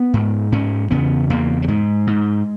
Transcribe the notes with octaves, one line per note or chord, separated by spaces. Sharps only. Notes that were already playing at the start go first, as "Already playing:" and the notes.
Already playing: B3
G#2
G#2 C#4
E2 C#3 B3
E2 C#3 A#3
F#3
G#2 G#3
G#2